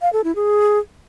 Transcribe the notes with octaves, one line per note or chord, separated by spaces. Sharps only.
F5
A4
E4
G#4